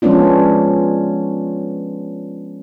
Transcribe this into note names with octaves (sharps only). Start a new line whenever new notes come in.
F3 G#3 B3 C#4 D4 F4